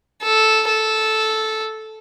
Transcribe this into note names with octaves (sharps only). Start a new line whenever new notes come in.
A4
A4